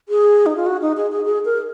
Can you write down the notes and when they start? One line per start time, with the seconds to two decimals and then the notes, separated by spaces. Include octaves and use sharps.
0.09 G#4
0.46 D#4
0.56 F4
0.66 F#4
0.82 D#4
0.97 G#4
1.12 G#4
1.25 G#4
1.45 A#4